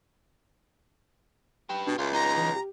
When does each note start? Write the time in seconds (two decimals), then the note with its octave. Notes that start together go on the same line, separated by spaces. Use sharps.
1.70 G4 B4 G5
1.87 B2 D4
1.98 C#2 E4 F4 C6
2.13 B3 D#4 A#5
2.37 E3
2.55 G4